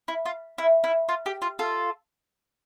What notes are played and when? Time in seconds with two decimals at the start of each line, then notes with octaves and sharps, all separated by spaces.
0.08 E4
0.26 F4
0.58 E4
0.84 E4
1.09 F4
1.26 G4
1.42 F4
1.59 F4 A4